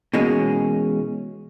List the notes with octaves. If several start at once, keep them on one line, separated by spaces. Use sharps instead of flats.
B2 E3 G#3 A#3 C#4